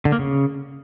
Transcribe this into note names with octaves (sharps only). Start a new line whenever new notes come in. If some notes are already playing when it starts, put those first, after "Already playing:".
D3
A#3
C#3